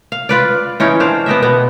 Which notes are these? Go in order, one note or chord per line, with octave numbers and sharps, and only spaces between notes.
F5
F4 B4 D5
E3 C#4 D#4
D4 C5 F5
B3 G4 D#5 E5
B2 B3